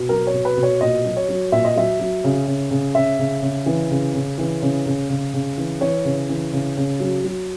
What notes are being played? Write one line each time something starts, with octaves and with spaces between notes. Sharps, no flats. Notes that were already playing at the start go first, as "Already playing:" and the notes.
Already playing: B2
F#3 A#4
C#5
B2
B4
B2
C#5
A#2 D#5
F#3
C#5
F#3
A#2 E5
D#5
F#3 E5
F#3
C#3
C#3
C#3
C#3 E5
C#3
C#3
E3
C#3
C#3
E3
C#3
C#3
C#3
C#3
E3
E3 C#5
C#3
E3
C#3
C#3
F#3
F#3